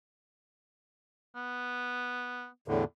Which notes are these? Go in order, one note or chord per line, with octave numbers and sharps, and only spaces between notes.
B3
E2 A2 D3